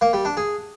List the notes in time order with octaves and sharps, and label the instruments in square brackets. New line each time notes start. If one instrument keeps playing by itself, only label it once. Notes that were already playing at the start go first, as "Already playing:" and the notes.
[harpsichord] A#3
G3
D4
G#4